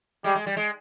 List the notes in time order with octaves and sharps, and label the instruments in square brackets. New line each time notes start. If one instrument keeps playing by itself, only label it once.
[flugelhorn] G3 [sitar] G#3
[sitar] G#3
G3
G#3